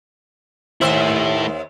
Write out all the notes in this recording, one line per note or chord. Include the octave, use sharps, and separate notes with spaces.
D#2 A3 E4 C5 E5